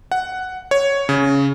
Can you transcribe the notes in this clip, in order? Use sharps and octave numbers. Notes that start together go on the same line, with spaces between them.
F#5
C#5
C#3